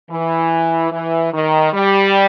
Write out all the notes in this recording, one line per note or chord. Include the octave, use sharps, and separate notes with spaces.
E3
E3
D#3
G3